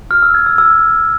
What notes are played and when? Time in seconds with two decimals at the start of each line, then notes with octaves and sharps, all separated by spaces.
0.11 F6
0.23 E6
0.34 G#6
0.46 E6
0.58 E6